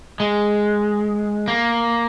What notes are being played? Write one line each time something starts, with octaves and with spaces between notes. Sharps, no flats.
G#3
A#3